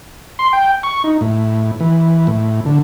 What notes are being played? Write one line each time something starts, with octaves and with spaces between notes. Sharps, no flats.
C6
G5
C#6
D#4
A2
E3
A2
D3